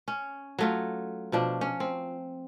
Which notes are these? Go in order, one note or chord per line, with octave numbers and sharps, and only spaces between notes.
C#4
F#3 A3 F4
B2 F3 D4
C#4
C4